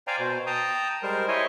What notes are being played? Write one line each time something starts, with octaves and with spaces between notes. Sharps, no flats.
C5 D5 F5 G5 G#5 A#5
B2 C5
G5 A5 A#5 D#6
G3 G#3 A#4 C5
E4 C5 C#5 D#5 G#5